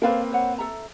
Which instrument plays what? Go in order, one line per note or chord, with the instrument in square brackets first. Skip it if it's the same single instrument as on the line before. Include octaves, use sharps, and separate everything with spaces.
[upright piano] A#3 C4 B4 [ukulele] A4 D5 F5
[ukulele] C5 C#5 F#5
A4 E5 A#5